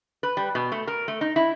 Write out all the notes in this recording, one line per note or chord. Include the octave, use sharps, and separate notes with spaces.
B4
G3
B2
A3
A#4
A3
D#4
E4